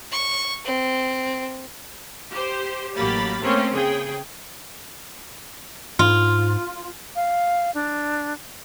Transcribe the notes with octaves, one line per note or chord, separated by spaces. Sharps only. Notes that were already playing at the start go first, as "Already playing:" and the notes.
C#6
C4
G4 C5
A1 F#3 A#3 G4 B5 A6
A3 A#3 C4 C#4 C#5
C#3 G#4 G5
G#2 F4
F5
D4